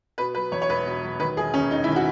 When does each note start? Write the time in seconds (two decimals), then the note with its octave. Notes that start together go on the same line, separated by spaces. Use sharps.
0.18 B2 B4
0.35 F#3 B4
0.51 E2 C#5
0.62 C#5
0.69 E1 B4
0.85 B2
1.03 F#3
1.19 D#3 B4
1.37 E1 G#4
1.54 D#2 C#4
1.70 E1 D#4
1.84 E4
1.87 D#3
1.96 F#4